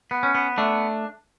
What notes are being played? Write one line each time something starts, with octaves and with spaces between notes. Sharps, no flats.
B3
C#4
B3
A3 D4